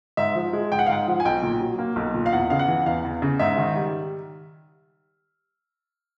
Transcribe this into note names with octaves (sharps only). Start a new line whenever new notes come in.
G#2 E5
F3
G#3
G#2 G5
F#5
F5
G#2 F#5
F3
G#5
B1 G5
A#2
F#3
A#3
B1
A#2
F5
E2 F#5
C#3 F5
F#5
E3
E2 F5
E2
C#3
G#2 E5
D#3
G3